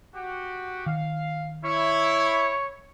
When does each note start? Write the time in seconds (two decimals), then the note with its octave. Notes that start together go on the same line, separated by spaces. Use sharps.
0.15 F#4 G4
0.86 D#3 F5
1.65 E4 C#5